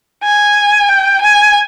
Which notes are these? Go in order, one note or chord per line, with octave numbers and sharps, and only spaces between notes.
G#5
G5
G#5